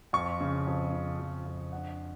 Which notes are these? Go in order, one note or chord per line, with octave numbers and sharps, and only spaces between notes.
F2 C#6
C#3
F2
C#3
F2
F2
D4 F#5